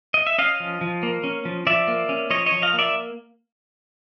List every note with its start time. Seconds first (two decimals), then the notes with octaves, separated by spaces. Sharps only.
0.14 D#5
0.27 E5
0.38 C#4 D#5 F5
0.60 F3
0.81 F3
1.03 A#3
1.24 C#4
1.45 F3
1.67 F3 D5 E5
1.88 A#3
2.09 C#4
2.30 F3 C#5 D#5
2.46 C#5 D#5
2.52 F3
2.62 D#5 F5
2.73 A#3
2.79 D5 E5